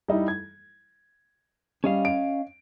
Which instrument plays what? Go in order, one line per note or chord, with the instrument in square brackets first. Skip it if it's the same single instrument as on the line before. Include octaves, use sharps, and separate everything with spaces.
[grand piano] G3 D#4 E4
G#6
[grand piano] G3 [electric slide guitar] C#4 D#5 F5
[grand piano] D7